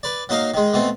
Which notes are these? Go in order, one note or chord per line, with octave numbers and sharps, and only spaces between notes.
B4 D5
F#3 A#3 D#4 D#5 F5
D#3 G#3
B2 A3 C4